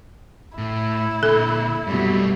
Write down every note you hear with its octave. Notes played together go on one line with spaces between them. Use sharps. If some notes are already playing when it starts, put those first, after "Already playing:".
A2 E4
A#2 D3 A4
F#2 B2 G3 A3